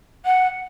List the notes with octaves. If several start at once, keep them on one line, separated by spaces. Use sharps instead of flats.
F#5